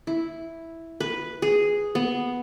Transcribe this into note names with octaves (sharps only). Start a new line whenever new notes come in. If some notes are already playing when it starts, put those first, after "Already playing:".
E4
B4
G#4
B3